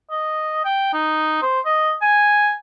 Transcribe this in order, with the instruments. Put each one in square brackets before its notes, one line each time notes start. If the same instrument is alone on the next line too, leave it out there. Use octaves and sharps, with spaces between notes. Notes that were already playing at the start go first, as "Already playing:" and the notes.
[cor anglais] D#5
G5
D#4
C5
D#5
G#5